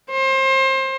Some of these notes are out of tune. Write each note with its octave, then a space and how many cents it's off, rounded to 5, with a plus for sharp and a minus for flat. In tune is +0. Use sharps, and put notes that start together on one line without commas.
C5 +30